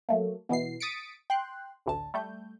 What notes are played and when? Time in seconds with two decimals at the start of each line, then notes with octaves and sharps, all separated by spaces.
0.09 F#3 A3 A#3
0.49 B2 E3 B3 C7
0.80 D#6 A6 B6 C#7 D7
1.30 G5 C6 F#6
1.86 A1 D2 A5
2.14 G3 A3 G6